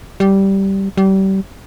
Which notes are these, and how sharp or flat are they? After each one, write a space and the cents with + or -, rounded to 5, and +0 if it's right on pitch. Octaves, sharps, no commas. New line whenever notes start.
G3 -10
G3 -30